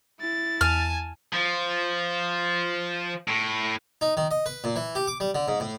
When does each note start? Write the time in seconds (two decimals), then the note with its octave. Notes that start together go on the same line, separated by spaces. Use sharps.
0.20 E4 A6
0.61 E2 G#5 A5 F6
1.33 F3
3.28 A2
4.01 D#4
4.17 D#3
4.31 D#5
4.46 B4
4.64 A#2
4.76 E3
4.95 G4
5.07 D6
5.20 G3
5.35 D3
5.48 G#2
5.60 A2